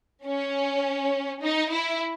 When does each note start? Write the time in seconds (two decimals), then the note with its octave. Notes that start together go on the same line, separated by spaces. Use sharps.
0.26 C#4
1.42 D#4
1.71 E4